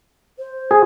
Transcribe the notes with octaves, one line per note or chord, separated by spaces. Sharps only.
C5
G#4